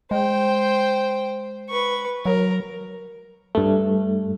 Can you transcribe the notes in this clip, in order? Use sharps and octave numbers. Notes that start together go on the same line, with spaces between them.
G#3 C5 G5
B4 C#6
F#3 A#4
G2 A3